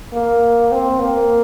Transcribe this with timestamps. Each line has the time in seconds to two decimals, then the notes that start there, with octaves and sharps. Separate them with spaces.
0.13 A#3
0.72 C4
1.00 A#3